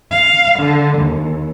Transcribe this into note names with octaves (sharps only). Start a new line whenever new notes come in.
F5
D3
D#2